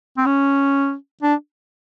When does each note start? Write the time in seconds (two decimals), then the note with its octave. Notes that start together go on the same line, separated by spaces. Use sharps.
0.17 C4
0.26 C#4
1.23 D4